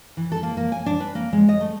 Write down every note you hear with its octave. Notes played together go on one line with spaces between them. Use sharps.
E3
A4
A#3
A#3
G#5
D4
B4
A#3
G#3
D#5
A3